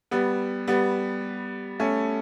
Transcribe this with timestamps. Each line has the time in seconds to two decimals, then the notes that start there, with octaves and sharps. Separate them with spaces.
0.11 G3 B3
0.67 G3 B3
1.80 A3 C#4